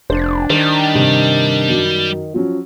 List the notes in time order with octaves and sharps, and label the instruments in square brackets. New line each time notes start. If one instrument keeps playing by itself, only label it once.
[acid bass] F1 [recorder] D4 [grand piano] C5
[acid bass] D#3 [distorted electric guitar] G3 [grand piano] C5
[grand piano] G2 C3
F#2 F#3
F3 F#3 C#4